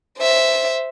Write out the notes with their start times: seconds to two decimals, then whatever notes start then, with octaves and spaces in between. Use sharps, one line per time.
0.18 C5 E5